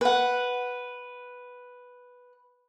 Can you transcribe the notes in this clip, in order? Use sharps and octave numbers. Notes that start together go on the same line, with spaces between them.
B4 F#5